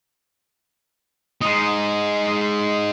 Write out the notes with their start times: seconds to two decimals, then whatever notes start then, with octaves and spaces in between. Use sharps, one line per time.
1.41 G#3 D#4